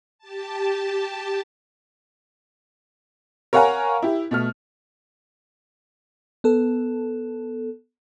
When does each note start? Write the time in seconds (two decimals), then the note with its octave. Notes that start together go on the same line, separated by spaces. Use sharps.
0.18 G4 A5
3.53 A#4 C#5 F5 F#5 G#5 A#5
4.02 E4 G4
4.31 B2 A3 F6
6.44 B3 A4